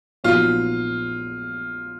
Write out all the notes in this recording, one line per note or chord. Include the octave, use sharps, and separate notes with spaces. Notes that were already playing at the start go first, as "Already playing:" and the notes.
A#1 A#2 F#3 B3 D#4 F4